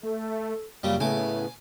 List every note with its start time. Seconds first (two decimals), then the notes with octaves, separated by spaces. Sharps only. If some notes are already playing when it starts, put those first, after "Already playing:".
0.03 A3 A4
0.83 F#2 A#2 C#3 G3
1.00 A2 C#3 B3 E5 G#5 D6